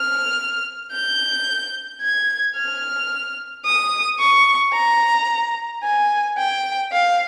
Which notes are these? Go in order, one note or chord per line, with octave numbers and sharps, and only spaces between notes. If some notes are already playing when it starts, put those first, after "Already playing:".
Already playing: F6
G6
G#6
F6
D#6
C#6
A#5
G#5
G5
F5